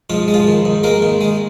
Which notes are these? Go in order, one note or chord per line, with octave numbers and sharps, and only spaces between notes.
G#2 F3 F4
G#3
F3 F4
D#3
G#2
G#3 A#3 A#4
D#3
G#3